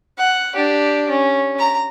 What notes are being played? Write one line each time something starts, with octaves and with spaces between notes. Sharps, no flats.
F#5
D4 G4
C#4
A#5